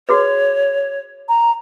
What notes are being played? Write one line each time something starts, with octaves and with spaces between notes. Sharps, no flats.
F#4 G#4 B4 C#5
A#5